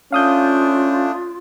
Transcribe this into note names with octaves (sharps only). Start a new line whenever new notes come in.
A3 C#4 D4 F4 F5 D#6 G6